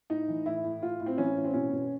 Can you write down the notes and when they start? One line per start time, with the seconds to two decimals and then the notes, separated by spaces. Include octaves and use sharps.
0.10 A2 D#4
0.28 E3
0.46 A2 E4
0.64 A2
0.82 A2 F4
1.00 A2
1.06 C4
1.17 E3 C#4
1.36 A2
1.45 C4
1.54 B2 C#4
1.72 B2